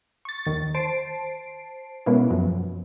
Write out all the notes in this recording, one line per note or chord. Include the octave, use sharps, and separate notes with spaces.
C#6 A6
D#2 D#3 A6
C5 A5 C7 D7
B2 G#3 A#3 B3 C#4 E4
F#2 F3 F#3